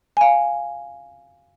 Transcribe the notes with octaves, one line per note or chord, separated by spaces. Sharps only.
F5 G#5